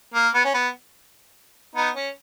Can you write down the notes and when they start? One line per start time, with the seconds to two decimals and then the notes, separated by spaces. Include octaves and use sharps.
0.14 A#3
0.34 B3
0.45 C#4
0.54 B3
1.75 B3 D#4
1.95 C#4